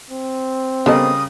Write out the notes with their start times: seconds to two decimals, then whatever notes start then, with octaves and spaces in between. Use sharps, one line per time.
0.11 C4
0.86 C#3 G3 B3 A4 A#4 D#5 D#6